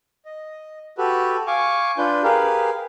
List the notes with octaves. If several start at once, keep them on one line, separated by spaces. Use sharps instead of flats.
D#5
F#4 G4 A4 B4
F5 G#5 C#6 D6
D4 F4 B4 G6
G4 G#4 A#4 B4 F5